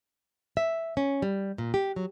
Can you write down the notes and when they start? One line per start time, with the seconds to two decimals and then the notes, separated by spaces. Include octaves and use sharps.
0.57 E5
0.97 C#4
1.22 G3
1.58 A#2
1.74 G4
1.96 F#3